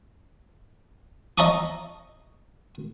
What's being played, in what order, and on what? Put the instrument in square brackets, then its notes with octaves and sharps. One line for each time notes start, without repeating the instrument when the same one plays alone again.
[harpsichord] D#5 E5 A5 A#5 C#6 D#6